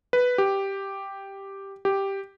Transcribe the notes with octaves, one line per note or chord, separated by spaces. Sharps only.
B4
G4
G4